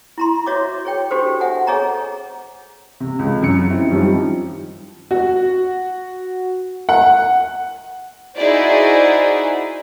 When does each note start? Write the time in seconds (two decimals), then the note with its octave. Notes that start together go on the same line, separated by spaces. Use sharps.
0.18 E4 A#5 C6
0.46 F#4 C#5 D#5 E5 D6
0.85 G#4 C#5 G5
1.11 D4 F#4 G4 A4 C5
1.40 E5 F#5 G#5 A5
1.67 G#4 A4 C#5 D#5 G#5 A#5
3.00 C3
3.19 C#2
3.42 F#2 C#7
3.70 C4 E4
3.89 F#2 D#3 F3 G3
5.11 F#4
6.89 F#5
8.36 D#4 E4 F#4 G#4 C5 D5